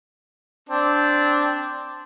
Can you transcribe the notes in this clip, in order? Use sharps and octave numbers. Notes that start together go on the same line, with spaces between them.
C4 D4